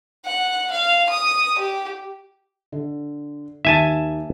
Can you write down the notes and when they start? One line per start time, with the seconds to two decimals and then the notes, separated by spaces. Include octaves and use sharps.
0.25 F#5
0.71 F5
1.09 D#6
1.58 G4
2.72 D3
3.65 D#2 E5 G#5 A5